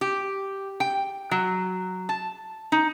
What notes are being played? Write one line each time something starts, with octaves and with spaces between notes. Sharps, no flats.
G4
G5
F#3
A5
D#4